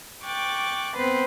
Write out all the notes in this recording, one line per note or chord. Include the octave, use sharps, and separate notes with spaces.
G5 C#6 D6 F#6 A6
B3 C4 B4 C5